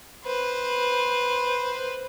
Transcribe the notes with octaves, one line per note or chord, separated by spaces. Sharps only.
B4 C5